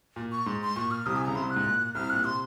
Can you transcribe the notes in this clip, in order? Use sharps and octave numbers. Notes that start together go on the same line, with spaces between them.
A#2
C#6
G#2 C6
C6
A#2 C#6
F6
C2 C3 D#6
G#5
C#3 A#5
C2 C3 C6
F#6
G#2
A#2
C2 C3 F6
A#2 F#6
C3 C6